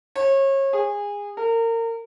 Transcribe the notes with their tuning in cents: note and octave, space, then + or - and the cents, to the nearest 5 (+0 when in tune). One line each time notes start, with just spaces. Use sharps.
C#5 -30
G#4 -25
A#4 -30